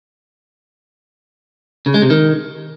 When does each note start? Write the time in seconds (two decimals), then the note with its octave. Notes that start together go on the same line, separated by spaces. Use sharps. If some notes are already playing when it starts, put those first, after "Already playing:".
1.86 C#3
1.94 G#3
2.02 C3
2.10 D#3